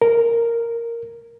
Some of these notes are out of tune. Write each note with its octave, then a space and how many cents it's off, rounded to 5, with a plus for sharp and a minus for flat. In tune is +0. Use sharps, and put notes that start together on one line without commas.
A#4 -5